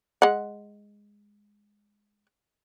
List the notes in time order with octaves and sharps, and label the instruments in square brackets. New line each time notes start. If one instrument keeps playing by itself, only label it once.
[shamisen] G#3 F#5